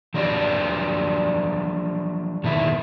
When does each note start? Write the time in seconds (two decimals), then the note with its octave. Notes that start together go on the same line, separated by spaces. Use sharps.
0.14 F3 F#3 D4 F#4 G4 D5
2.44 B2 D#3 E4